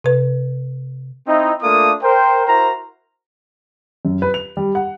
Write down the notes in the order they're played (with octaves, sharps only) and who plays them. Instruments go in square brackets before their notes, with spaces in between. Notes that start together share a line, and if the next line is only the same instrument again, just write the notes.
[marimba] C3 B4
[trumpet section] C4 D#4 E4
A3 A#3 D4 F4 A4 D#6
A#4 C5 G5
E4 F#4 A#4 C5 A#5
[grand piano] F#2
B4
F7
G3
F#5